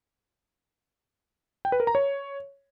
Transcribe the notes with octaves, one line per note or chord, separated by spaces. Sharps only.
G5
B4
A#4
A#5
C#5